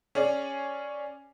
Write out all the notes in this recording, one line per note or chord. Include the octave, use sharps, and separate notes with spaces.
C#4 G#4 D5